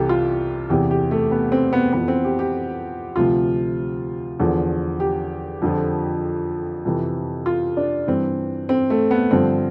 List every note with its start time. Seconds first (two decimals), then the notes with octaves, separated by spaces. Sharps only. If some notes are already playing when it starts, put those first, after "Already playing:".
Already playing: C2 C3 E3 G4 A4
0.09 F4
0.70 E2 C3 E3 G4
0.91 G4
1.11 A3
1.31 B3
1.52 C4
1.73 B3
1.93 F2 E3 B3
2.08 C4
2.25 G4
2.39 G4
3.16 D2 C3 F3 F4
4.39 E2 D3 F3
5.00 G4
5.62 F2 D3 F3
6.85 F2 C3 E3
7.46 F4
7.77 D4
8.08 G2 E3 C4
8.69 C4
8.90 A3
9.11 B3
9.31 G2 D3 F3 C4